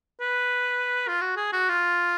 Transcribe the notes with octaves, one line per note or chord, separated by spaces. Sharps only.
B4
F4
F#4
G#4
F#4
F4